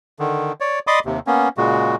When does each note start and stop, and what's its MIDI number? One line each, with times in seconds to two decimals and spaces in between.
0.19 0.52 50
0.19 0.52 51
0.60 0.79 73
0.60 0.79 74
0.87 1.00 74
0.87 1.00 75
0.87 1.00 83
0.87 1.00 84
0.87 1.00 86
0.87 1.00 87
1.05 1.19 39
1.05 1.19 48
1.27 1.49 58
1.27 1.49 59
1.27 1.49 61
1.58 1.96 46
1.58 1.96 49
1.58 1.96 56
1.58 1.96 66